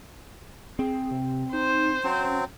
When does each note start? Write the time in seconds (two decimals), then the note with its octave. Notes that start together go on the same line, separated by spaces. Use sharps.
0.79 C4 G#4
1.11 C3
1.53 D#4 C5
2.04 F#3 C4 C#4